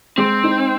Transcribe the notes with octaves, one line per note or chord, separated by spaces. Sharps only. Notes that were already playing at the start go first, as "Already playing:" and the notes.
G#3 C4
D#4